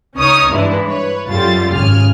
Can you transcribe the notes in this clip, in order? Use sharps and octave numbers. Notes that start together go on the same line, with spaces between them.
C#2 C#4 D#4 C#5 D#6 F6
G2 E3 G#3 D4 E4
B4 C#5
F#2 G3 F4 G4 A4 A6
G#1 C#3 G#5 F6